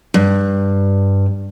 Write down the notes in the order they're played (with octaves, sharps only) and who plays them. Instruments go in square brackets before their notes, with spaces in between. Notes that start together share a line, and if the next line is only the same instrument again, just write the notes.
[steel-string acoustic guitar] G2